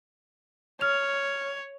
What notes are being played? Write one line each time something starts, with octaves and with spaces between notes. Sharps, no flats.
C#5 F6 F7